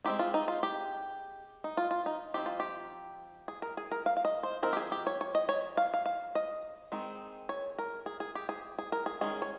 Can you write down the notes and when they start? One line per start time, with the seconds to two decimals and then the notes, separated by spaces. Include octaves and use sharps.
0.04 G#3 C4 D#4 G4
0.19 F4
0.34 D#4
0.48 F4
0.63 G4
1.64 D#4
1.77 F4
1.91 F4
2.06 D#4
2.34 F3 C4 D#4 G4
2.46 F4
2.60 G4
3.48 G#4
3.62 A#4
3.77 G#4
3.92 A#4
4.06 F5
4.17 F5
4.25 D#5
4.43 C5
4.62 F3 C4 D#4 A#4
4.73 G4
4.77 G#4
4.92 G4
5.07 C#5
5.21 C#5
5.35 D#5
5.49 C#5
5.77 F5
5.94 F5
6.06 F5
6.35 D#5
6.92 D#3 G#3 C4 D#4
7.49 C#5
7.79 A#4
8.06 G#4
8.20 G#4
8.35 G4
8.49 G#4
8.79 G#4
8.92 A#4
9.06 G#4
9.21 D#3 G#3 C#4 G#4
9.42 C#5